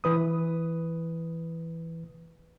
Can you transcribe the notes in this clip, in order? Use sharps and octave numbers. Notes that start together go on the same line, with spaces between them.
E3 B4 D#6